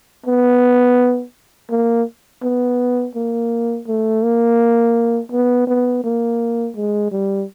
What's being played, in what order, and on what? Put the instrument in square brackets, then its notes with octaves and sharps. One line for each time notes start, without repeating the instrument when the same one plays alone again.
[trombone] B3
A#3
B3
A#3
A3
A#3
B3
B3
A#3
G#3
G3